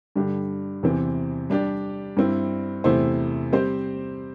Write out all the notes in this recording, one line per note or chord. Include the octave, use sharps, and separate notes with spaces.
G2 D3 G3 D4 G4
E2 C3 E3 C4
G3 D4 G4 D5
G2 G3 C4 E4
E2 C3 A3 E4 C5
G3 C4 G4 C5